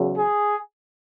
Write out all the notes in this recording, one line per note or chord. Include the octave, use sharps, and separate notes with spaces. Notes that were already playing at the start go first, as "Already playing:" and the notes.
Already playing: E2 C#3 F#3
G#4